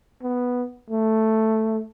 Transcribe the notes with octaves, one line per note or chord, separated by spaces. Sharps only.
B3
A3